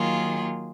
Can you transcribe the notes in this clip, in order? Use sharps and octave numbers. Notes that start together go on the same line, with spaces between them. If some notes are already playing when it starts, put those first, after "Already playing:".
Already playing: D#3 F#3 A#3 F4 G#4